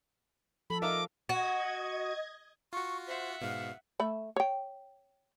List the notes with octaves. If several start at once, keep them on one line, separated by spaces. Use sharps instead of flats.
F3 A4 B5
D#4 A#4 E5 F5 D6
F#4 D#5 G#6
F4 F#4 C#6
C5 E5 F#5
G#2 B2 F5
A3 E5 B5
C#5 G5